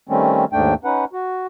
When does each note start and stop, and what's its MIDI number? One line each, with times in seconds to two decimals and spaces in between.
0.09 0.45 51
0.09 0.45 55
0.09 0.45 57
0.09 0.45 60
0.09 0.45 61
0.53 0.74 39
0.53 0.74 44
0.53 0.74 57
0.53 0.74 62
0.53 0.74 79
0.84 1.05 61
0.84 1.05 63
0.84 1.05 71
0.84 1.05 78
1.13 1.47 66